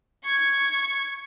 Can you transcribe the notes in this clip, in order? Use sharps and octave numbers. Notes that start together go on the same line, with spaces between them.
C#6 G#6